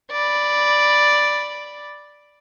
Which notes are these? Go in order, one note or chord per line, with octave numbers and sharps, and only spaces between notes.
D5 B5